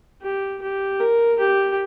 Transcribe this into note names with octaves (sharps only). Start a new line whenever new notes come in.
G4
G4
A#4
G4